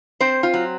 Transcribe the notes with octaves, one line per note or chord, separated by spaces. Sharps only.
C4 C5
F4
F#3